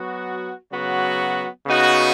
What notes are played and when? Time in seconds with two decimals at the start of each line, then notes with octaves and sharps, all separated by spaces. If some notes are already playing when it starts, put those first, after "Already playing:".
Already playing: F#3 B3 F#4
0.72 C#3 F#3 B3 F#4
1.67 C#3 B3 D#4 F#4